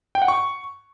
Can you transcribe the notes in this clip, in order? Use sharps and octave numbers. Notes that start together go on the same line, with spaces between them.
G5
F#5
C#6